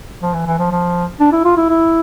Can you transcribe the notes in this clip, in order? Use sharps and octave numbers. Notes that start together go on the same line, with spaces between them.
F3
E3
E3
F3
F3
D4
E4
F4
E4
E4